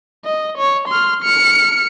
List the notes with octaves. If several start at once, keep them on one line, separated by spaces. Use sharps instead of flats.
D#5
C#5
C6 F6
F6 C#7